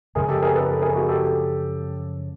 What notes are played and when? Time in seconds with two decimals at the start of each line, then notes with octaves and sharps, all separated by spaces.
0.15 F#2 C#3 F3 G#3 G#4 A#4
0.29 G4 A4
0.42 G#4 A#4
0.55 A4 B4
0.68 A4 B4
0.82 G#4 A#4
0.95 F#4 G#4
1.08 G4 A4